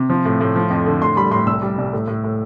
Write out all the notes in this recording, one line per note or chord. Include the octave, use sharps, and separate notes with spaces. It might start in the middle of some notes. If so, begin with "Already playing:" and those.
Already playing: C3
F3
A2
A2
F3
F2
D3
A2 C6
G3 B5
A2 C6
C2 E6
G3
C2
A2
A2
A2